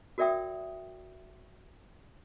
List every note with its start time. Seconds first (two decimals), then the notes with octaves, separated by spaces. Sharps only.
0.18 F#4 A#4 D5 E5 G5 D#6